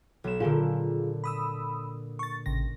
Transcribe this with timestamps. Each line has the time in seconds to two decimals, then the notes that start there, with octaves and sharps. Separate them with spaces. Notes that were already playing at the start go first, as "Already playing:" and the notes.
0.24 B1 E7
0.40 A#2 D3 F4 G#4
1.24 B5 D#6 E6
2.19 C#6 A6
2.46 A1 C#3 A#6